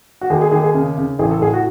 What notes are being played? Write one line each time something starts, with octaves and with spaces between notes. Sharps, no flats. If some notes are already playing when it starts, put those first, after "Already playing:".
F#4
D#2 G#4
G#4
D#2 G#4
G#4
C#3
C#3
A1 G#4
A4
A2 G#4
F#4